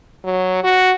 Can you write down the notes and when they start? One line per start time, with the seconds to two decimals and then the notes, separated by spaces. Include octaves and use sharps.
0.24 F#3
0.64 F#4